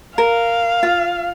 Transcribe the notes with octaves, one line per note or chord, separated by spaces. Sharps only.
A#4 F5
F4